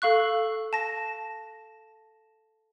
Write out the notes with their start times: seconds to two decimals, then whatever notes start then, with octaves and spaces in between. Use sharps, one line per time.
0.02 A4 F5 C#6 F#6
0.73 A5 A#6